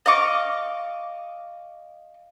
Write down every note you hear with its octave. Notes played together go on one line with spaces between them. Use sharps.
D#5 F5 C#6 D6